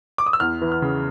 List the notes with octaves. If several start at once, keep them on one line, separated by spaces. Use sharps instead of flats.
D6
D#6
E6
E2 F6
E3
F6
C#3